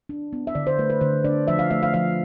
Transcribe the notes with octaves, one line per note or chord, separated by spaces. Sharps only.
D4
B3
E5
D3 D5
C5
A3 B4
B4
D3 C5
D4 D5
F3 E5
F5
A3 E5
F5
F3 F5